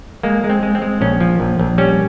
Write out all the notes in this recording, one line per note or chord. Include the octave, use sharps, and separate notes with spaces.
G#3 A#3
G#3
C4
G#3
C4
G#3
A#1 C#4
F3
A#1
A#1
G3 C#4